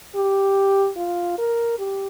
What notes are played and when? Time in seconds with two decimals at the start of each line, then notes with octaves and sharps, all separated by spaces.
0.15 G4
0.97 F4
1.38 A#4
1.78 G4